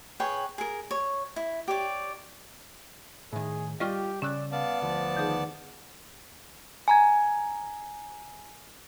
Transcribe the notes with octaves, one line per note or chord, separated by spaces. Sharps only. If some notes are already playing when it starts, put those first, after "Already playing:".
G#4 B4 C#5 G5
G#4 A#4
C#5
E4
G4 C#5 D5
A2 D#3 G#4
G3 F4 G4 D5 D#5 C#6 F6
C#3 C#4 D5 E6 F#6
B3 D5 F5 A5
D2 F3
D#3 D#4 G#4
G#5 A#5 G#6